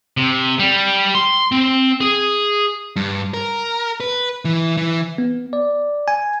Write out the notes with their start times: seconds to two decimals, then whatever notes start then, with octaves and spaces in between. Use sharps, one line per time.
0.17 C3
0.59 G3
1.15 C6
1.52 C4
2.01 G#4
2.96 G2
3.34 A#4
4.00 B4
4.45 E3
4.77 E3
5.18 B3
5.53 D5
6.08 G#5